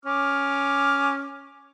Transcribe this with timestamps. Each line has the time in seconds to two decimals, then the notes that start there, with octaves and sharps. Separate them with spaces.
0.05 C#4 D6 F6